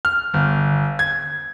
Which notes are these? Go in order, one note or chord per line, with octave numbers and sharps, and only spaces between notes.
F6
G1
G#6